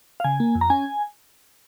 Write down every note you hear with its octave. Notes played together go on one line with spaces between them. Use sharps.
F5
C#3 G#5
A#3
F2
A#5
C#4 G#5